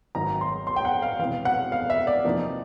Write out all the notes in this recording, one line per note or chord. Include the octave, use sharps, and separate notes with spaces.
G#1 G#2 D#3 F#3 A#5
C6
C6
G5
F#5
F5
E1 E2 C3 F5
F#5
F5
E5
D5
E2 C3 F3 A#3 D#4